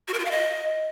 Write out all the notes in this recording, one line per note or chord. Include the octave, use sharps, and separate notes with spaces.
F#4
A#4
F4
F5
D#5